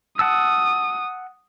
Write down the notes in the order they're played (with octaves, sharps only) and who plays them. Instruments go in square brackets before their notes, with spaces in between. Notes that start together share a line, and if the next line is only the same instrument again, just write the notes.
[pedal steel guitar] F#5 A5 E6 [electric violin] D#6